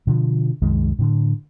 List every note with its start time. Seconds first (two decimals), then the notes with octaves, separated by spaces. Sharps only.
0.07 B2 D3 F3
0.62 C2 F#2 D#3 G#3
0.99 A2 D3